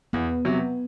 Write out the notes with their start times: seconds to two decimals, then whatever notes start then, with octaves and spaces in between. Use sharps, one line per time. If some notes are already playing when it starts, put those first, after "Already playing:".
0.13 E2 B3
0.45 C3 F#3